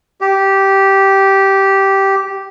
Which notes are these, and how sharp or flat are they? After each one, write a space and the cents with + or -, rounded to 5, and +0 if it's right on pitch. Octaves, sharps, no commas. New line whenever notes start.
G4 -10